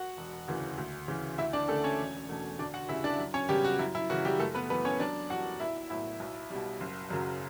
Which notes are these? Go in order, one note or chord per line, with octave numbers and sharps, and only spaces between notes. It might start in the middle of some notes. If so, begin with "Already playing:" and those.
Already playing: F#4 F#5
E1
D2 C#3 E3
D2
C#3 E3
D2 E4 E5
D4 D5
D3 A3 C#4 A4
C#4 C#5
E1
E2 B2 A3 D4
D2 D4 D5
F#4 F#5
C#3 G3 C#4 E4 E5
D4 D5
F#2
C#4 C#5
C#3 F#3 G3 B3 G4
F#4
F#2 E4
E4
C#3 E3 F#4
G3 G4
F#1 A3 A4
B3 B4
F#2 E3 B3 B4
C#4 C#5
F#2 D4 D5
E3 G3 D4 F#4 F#5
B1 E4 E5
A2 F#3 B3 E4 E5
B1
B2 G3
F#1
F#2 C#3 F#3